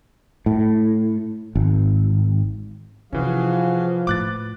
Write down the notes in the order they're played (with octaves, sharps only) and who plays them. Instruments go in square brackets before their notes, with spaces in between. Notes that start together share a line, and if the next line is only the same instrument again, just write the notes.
[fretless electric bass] A2
G#1
[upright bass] C3 [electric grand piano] E3 C#4 [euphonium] F3 [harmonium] F#4 G#4 F5
[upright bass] A2 [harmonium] B4 [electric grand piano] D6 F#6 A6